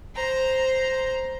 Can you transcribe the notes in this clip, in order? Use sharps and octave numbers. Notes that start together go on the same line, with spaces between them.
C5 A#5